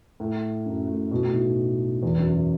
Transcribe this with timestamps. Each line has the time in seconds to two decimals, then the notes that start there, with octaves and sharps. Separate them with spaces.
0.20 A2
0.66 F#2
0.88 A2
1.11 B2
1.22 A2
1.33 B1 B2
2.03 E2 E3
2.18 F#2 F#3
2.33 F#3